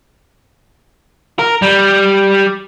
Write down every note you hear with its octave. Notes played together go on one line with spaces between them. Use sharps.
A#4
G3